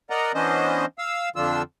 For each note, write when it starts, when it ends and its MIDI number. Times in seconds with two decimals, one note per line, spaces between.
0.10 0.32 70
0.10 0.32 74
0.10 0.32 75
0.10 0.32 78
0.10 0.32 82
0.34 0.85 52
0.34 0.85 59
0.34 0.85 61
0.34 0.85 62
0.34 0.85 72
0.34 0.85 75
0.98 1.29 77
0.98 1.29 88
1.36 1.62 41
1.36 1.62 50
1.36 1.62 53
1.36 1.62 62
1.36 1.62 65
1.36 1.62 88